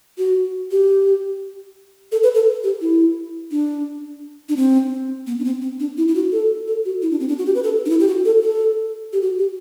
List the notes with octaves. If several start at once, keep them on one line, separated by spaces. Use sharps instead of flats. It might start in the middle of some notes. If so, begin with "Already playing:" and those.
F#4
G4
A4
B4
A4
G4
E4
D4
D4
C4
B3
D4
C4
C4
D4
E4
E4
F#4
A4
A4
F#4
E4
D4
C4
D4
F#4
G4
B4
A4
D4
E4
G4
F#4
A4
A4
G4
F#4
G4